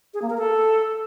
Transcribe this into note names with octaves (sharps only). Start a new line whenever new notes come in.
G#4
A#3
A#4
A4